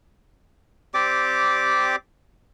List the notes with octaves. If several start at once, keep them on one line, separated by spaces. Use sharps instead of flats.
C4 G4 D5 D6